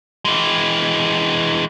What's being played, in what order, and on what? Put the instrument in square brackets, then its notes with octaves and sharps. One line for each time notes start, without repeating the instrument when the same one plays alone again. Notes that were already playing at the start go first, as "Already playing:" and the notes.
[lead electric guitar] E3 G#3